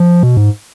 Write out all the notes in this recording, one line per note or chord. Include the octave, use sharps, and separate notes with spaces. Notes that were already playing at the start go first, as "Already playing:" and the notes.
Already playing: F3
B2
G#2